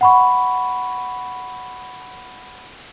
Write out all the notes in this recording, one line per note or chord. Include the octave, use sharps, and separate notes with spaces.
F#5 B5 C#6